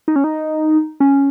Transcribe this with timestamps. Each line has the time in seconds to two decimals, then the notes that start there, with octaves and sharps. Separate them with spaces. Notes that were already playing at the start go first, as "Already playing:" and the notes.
0.08 D#4
0.16 C#4
0.24 D#4
1.00 C#4